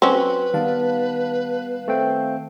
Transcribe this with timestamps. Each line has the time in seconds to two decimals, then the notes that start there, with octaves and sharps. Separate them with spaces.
0.02 F#3 C4 C#4 B4
0.54 D#3 G3 B3 F5 A5
1.88 A3 C4 G5